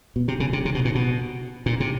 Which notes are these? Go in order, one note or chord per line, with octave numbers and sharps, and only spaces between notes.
B2
C3
C#3
C3
C3
B2
A#2
B2
A#2
C3